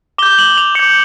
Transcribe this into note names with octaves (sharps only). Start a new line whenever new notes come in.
D6 G6 G7
F#7
F7
D6 G6 C#7